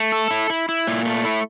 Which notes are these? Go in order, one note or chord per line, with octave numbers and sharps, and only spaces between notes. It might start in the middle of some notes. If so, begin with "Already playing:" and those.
Already playing: A3
A4
E4
E4
E4
A#2
A3
E4